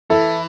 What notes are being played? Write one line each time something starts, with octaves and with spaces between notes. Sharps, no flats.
E3 E4 A4